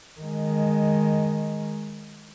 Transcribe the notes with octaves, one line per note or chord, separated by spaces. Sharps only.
D#3 G#3